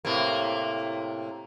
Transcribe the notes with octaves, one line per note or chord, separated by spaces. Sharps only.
A2 C3 A#3